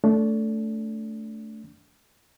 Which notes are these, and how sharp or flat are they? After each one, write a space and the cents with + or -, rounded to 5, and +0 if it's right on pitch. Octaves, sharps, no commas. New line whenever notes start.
A3 +0 D4 -30